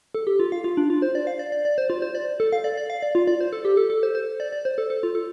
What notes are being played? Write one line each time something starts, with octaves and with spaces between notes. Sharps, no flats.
A4
G4
F4
F5
F4
D4
F4
C5
D5
F5
D5
D5
D5
C5
F4
C5
D5
A4
F5
D5
D5
F5
D5
F4
D5
C5
A4
G4
A4
A4
C5
C5
D5
D5
C5
A4
A4
F4
A4